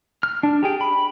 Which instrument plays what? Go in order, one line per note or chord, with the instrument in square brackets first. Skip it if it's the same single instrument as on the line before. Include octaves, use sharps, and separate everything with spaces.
[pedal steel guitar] F6
D4
G4 G#4 G5
B5